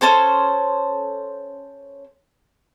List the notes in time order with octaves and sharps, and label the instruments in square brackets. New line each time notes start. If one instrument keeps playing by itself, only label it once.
[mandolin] C#4 A4 C5 C#5